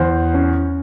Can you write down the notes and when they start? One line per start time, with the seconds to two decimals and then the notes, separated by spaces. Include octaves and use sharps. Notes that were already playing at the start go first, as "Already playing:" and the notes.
Already playing: E2 C5
0.34 C#4